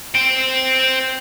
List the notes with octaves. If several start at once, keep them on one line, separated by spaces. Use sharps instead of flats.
C5 G5